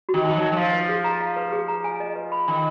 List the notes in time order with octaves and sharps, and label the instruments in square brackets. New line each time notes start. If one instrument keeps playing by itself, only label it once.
[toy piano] F#4
[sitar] D#3
[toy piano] D#4
[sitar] F3
F#3
[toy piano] D#4
[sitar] F#3
[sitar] F3 [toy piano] F5
[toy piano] B4
G#4
A#5
F5
B4
G#4
A#5
G#5
D#5
B4
B5
[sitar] D#3 [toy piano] G#5